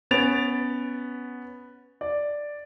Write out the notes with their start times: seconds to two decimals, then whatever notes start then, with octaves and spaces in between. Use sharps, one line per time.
0.11 B3 C#4 A6 D7 F7
2.01 D5